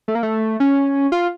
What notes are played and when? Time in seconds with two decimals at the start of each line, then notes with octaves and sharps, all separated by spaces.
0.08 A3
0.15 A#3
0.23 A3
0.60 C#4
1.12 F4